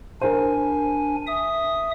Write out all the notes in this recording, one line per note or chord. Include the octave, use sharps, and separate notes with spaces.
D4 A#4 C5 G#5
E5 D#6